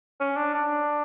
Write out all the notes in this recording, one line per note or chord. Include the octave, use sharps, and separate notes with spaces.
C#4
D4
D4